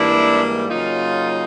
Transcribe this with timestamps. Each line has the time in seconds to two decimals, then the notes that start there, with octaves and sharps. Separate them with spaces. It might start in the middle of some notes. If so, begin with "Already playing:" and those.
Already playing: G#2 E3 G3 A#3 D4 E4
0.69 C#3 F#3 A#3 D#4 F4